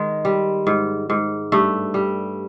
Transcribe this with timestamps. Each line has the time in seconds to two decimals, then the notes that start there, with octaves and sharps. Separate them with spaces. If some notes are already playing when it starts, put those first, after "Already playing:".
Already playing: D#3 G#3
0.25 G3
0.67 G#2
1.10 G#2
1.52 G2 A3
1.94 G3